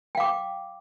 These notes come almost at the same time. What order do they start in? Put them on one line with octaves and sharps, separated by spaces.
G5 F5 D6